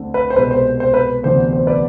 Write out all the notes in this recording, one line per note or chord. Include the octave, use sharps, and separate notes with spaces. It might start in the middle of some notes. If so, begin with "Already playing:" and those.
Already playing: D2 D3 A3 C4
B4
C5
C2 B2 G#3 B4
C5
C5
B4
D2 C3 E3 B3 D4 C5
C5
B4 D5